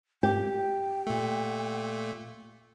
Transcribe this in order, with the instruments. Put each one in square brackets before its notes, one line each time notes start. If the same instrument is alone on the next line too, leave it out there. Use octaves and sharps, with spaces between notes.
[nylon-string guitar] G4 [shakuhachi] G5
[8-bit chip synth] A#2 A3